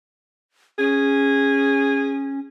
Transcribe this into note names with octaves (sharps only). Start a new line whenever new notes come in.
C#4 G#4